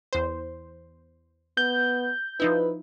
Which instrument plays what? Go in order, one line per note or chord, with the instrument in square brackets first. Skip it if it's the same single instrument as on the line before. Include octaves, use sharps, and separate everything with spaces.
[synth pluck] E2 C5
[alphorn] B3 [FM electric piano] G6
[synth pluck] F3 D#4 E4 [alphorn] B4